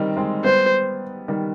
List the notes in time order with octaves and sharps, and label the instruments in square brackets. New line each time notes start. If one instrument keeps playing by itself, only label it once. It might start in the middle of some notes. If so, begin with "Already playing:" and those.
Already playing: [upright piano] D#3 G3 C4 D#4
G#3 C4
[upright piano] G3 B3 [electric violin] C5
[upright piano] D#3 G3